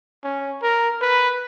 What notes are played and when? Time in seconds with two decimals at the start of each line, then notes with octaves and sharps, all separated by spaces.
0.24 C#4
0.62 A#4
1.02 B4